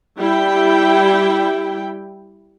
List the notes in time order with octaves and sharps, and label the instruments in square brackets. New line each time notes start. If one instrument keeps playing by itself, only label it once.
[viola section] G3 E4 G5